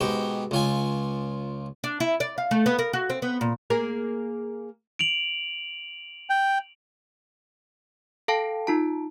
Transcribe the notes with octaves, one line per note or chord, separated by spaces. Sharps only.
G#2 B2 G4
C#2 F4 G#5
D4
E4
D5
F5
A3
B3
A#4
F#4
C4
B3
A#2
A#3 G#4 A#4
D7 F7 F#7
G5
A4 F5 G5 A5
D#4 F4 A5